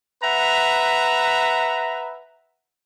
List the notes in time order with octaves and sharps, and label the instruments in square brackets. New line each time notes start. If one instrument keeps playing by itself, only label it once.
[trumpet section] B4 E5 F#5 A#5